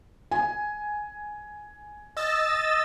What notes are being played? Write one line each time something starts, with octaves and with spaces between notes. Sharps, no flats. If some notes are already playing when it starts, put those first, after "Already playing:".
G#5
D#5 E6 A6